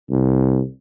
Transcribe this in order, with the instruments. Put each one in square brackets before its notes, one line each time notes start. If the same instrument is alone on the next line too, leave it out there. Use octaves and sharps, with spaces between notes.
[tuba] C2